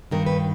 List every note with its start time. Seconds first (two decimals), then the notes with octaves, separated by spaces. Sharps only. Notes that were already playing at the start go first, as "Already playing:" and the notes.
0.11 G2 D#3 F#3 A#4
0.26 B4